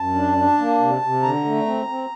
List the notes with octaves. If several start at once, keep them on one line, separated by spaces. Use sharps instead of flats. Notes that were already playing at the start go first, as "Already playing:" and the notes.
Already playing: F#2 A5
D4
D4
A#3
C3
C3
D3 A#5
A3
C4
C4